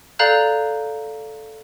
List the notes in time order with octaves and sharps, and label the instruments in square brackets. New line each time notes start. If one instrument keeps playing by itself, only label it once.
[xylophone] A4 D5 F5 A#5 F#6 G6